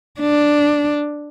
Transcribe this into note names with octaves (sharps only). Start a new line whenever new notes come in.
D4